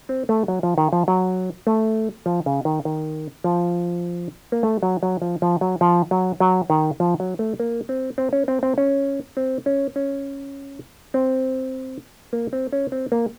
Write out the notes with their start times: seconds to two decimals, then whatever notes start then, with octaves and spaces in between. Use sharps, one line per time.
0.09 C4
0.29 A3
0.48 F#3
0.63 F3
0.78 D#3
0.93 F3
1.08 F#3
1.67 A3
2.26 F3
2.46 C#3
2.65 D#3
2.85 D#3
3.44 F3
4.52 A#3
4.63 A3
4.83 F#3
5.03 F#3
5.22 F3
5.42 F3
5.61 F#3
5.81 F3
6.11 F#3
6.40 F#3
6.70 D#3
7.00 F3
7.20 F#3
7.39 A3
7.60 A#3
7.89 C4
8.18 C4
8.33 C#4
8.48 C4
8.63 C4
8.78 C#4
9.37 C4
9.66 C#4
9.96 C#4
11.14 C4
12.33 A#3
12.53 C4
12.73 C#4
12.92 C4
13.12 A#3